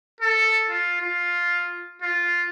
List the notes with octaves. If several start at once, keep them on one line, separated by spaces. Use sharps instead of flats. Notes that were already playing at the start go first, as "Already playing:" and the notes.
A4
F4
F4
F4